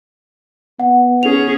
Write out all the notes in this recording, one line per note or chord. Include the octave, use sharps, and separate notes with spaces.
B3 F#5
C#4 G#4 F7